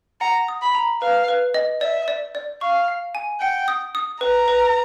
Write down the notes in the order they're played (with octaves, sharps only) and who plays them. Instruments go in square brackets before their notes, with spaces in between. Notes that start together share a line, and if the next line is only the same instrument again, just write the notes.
[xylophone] F#5 [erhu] A#5
[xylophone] D#6
[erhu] B5
[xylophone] A#5
[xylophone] B4 [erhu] F5
[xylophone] B4
D#5
[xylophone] D5 [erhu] E5
[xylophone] D5
D5
[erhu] F5 [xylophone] C#6
[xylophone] F5
G#5
[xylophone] F#5 [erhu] G5
[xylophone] D#6
D#6
[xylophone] B4 [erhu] A#5
[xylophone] B4